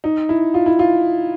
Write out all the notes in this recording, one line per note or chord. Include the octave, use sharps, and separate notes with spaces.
D#4
E4
F4
E4
F4